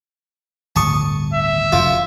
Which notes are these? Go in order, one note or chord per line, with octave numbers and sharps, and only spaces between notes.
D1 G1 A5 C#6 D#6
E5
F1 F#2 F4